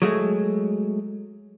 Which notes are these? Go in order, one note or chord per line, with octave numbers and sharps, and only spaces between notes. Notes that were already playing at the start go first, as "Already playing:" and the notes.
F#3 G#3 A3